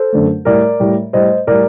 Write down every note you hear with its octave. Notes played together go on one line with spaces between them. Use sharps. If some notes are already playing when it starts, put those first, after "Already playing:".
Already playing: A4 C5
F#2 D3 A3
A2 G3 A#4 D5
A2 G3
A2 G3 C5 D#5
A2 G3 A#4 D5